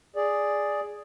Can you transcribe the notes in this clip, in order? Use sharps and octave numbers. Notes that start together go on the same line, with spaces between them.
G#4 D5